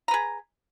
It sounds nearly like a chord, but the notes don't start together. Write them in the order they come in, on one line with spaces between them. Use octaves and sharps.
A#5 B4 G#4